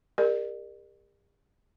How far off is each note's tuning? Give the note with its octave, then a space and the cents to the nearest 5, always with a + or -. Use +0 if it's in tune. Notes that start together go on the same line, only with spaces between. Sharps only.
G4 +45 A#4 +0 D5 +40